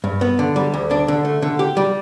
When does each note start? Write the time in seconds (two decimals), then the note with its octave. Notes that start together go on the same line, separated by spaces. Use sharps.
0.04 G2
0.21 B3
0.39 D3
0.56 G3
0.74 D2
0.91 D4
1.08 D3
1.25 A3
1.42 D3
1.59 G4
1.77 G3